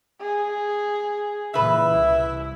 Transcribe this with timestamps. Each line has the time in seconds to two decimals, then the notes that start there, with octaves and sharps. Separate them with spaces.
0.21 G#4
1.54 A#2 C#3 E3 B4 E5
1.92 C2 E4